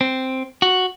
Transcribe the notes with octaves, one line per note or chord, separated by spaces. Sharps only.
C4
F#4